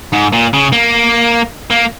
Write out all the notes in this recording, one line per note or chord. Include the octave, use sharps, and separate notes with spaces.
G#2
A#2
C#3
A#3
A#3